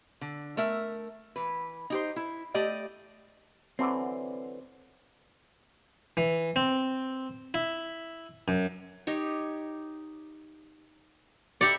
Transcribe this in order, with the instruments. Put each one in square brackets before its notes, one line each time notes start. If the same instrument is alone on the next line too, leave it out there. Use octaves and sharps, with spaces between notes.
[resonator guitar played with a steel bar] D3
A3 A#4 E5
E3 B4
D#4 G4 C5
E4
A3 G4 D5 D#5
[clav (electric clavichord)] D3 E3 F#3 [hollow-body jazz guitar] C4
[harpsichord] E3
C4
E4
F#2
[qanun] D#4 G4 C#5
[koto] G4 D5 [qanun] E5 A#5 B5 [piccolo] C#7